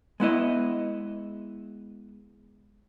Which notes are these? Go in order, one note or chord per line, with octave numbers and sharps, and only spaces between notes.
G#3 B3 E4 D#5